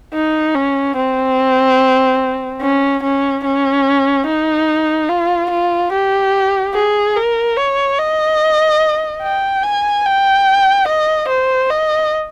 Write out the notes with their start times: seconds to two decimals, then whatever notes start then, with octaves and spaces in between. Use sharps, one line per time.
0.14 D#4
0.55 C#4
0.96 C4
2.61 C#4
3.03 C#4
3.44 C#4
4.27 D#4
5.09 F4
5.51 F4
5.92 G4
6.74 G#4
7.16 A#4
7.56 C#5
7.98 D#5
9.22 G5
9.63 G#5
10.05 G5
10.88 D#5
11.28 C5
11.70 D#5